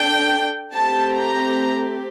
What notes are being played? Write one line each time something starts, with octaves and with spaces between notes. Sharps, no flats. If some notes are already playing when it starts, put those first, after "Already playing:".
Already playing: D4 A4 G5
A3 C4 G4 A5
A#5